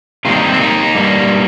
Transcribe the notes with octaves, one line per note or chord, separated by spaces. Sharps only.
C3 D#3 G3 A#3 F4
D#4
C4
A#3 D#4
G2 G3 A#3